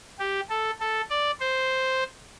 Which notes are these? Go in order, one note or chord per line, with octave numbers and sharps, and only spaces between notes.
G4
A4
A4
D5
C5